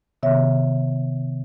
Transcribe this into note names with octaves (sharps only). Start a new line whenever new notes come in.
C3 D#3 B3 C#5 E5